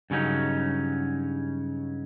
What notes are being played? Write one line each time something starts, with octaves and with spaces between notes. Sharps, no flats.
G2 C#3 F#3 C#4 D#4